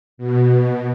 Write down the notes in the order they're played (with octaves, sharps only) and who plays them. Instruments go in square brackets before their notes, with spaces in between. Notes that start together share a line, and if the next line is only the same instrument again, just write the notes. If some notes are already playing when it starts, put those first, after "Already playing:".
[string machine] B2